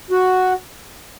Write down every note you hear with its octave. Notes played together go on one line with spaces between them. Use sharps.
F#4